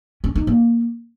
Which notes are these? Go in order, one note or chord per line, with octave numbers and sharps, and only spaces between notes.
C#4
D#4
A#3